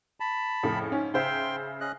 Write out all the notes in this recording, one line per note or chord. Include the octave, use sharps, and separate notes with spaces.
A5 B5
F2 A2 C#3
G#2 C#4
C#3 C5 E5 G5 C6
C#4 D#5 F#6